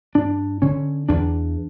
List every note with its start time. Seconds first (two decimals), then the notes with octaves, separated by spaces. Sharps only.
0.15 G2 D4
0.62 D3 C#4
1.09 E2 D4